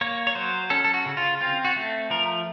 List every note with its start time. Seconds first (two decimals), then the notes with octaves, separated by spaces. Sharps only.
0.01 A#3 C#5
0.27 C#5
0.35 F#3 C5
0.70 C#4 A4
0.85 A4
0.94 F#4
1.06 C#3
1.17 F4
1.41 C4 F4
1.65 F#4
1.76 A3
2.10 F3 A#4